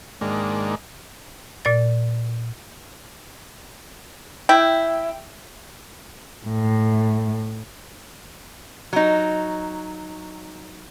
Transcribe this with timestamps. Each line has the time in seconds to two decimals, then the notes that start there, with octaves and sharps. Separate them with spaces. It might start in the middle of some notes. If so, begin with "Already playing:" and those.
0.21 G#2 D#3 G#3 A#3 D4
1.65 A#2 D5 A6
4.49 E4 G5
6.46 A2
8.93 F#3 D#4